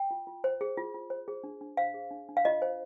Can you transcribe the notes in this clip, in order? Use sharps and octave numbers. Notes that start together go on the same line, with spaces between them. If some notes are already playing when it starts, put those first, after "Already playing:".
Already playing: G5
F4
F4
C5
G#4
F4
F4
C5
G#4
D4
D4
C5 F5
G#4
D4
D4
F5
F4 D#5
C5